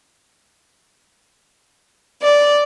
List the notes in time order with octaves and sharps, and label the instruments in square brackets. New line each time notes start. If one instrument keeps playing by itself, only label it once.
[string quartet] D5